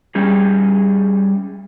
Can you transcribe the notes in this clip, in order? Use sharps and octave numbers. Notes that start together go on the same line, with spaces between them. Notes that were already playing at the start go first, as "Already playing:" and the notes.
G3 C#4 G#4